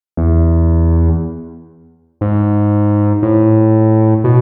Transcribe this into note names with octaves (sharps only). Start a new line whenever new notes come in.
E2
G#2
A2
B2